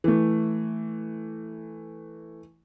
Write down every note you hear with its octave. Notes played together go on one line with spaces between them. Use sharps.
E3 A3